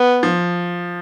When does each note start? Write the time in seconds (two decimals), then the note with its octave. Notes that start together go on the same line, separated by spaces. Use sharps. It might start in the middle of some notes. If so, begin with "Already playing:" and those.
Already playing: B3
0.23 F3